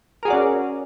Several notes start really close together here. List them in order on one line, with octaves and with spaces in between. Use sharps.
A#4 G#4 F#4 D5 C#4